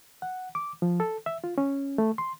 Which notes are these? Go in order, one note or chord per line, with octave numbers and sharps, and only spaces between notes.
F#5
D6
F3
A4
E5
F4
C#4
A3
C6